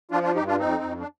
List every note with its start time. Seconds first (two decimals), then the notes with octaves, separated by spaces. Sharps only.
0.11 F3 D4 F4
0.23 D4 F4
0.35 G2 D#4 G4
0.47 D4 F4
0.59 F2 C4 D#4
0.83 F2
1.00 D4